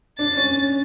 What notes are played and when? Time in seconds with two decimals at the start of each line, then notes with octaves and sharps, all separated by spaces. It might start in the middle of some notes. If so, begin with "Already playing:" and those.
0.19 D4 A6
0.37 C#4